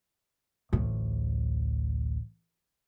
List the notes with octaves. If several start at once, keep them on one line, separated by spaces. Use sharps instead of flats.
A1 D2